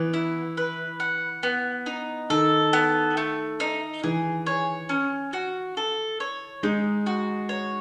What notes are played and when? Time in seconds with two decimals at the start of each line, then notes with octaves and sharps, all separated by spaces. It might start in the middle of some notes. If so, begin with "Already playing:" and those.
Already playing: E3 B3
0.14 E4
0.57 B4
1.00 F#5
1.43 B3
1.86 D#4
2.30 D#3 A4
2.73 B3
3.17 A3
3.60 D#4
4.04 E3 G#4
4.47 C#5
4.89 C#4
5.33 F#4
5.77 A4
6.20 C#5
6.63 G#3 D#4
7.06 F#4
7.49 C#5